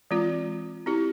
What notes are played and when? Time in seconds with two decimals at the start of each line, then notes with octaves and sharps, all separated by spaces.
0.11 E3 G#3 C4 F4
0.86 C4 E4 G4